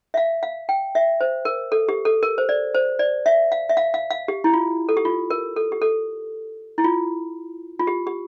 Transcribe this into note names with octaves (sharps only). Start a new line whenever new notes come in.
E5
F5
F5
G5
E5
C5
A#4
A4
G4
A4
A#4
C5
D5
C5
D5
E5
F5
E5
F5
F5
F5
G4
E4
F4
A4
G4
F4
A#4
A4
G4
A4
E4
F4
F4
G4
G4